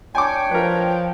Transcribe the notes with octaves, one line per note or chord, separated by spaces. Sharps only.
D4 C#5 G5 G#5 D6
F3 A#4 B4